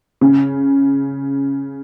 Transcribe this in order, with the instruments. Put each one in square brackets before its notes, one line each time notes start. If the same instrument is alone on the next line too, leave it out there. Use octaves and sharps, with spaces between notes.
[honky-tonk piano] C#3